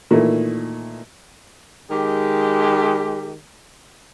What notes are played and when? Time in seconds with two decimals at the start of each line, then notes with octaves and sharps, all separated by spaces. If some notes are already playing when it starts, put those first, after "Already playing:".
0.11 A#2 D#3 E3 A3
1.91 D#3 G#3 G4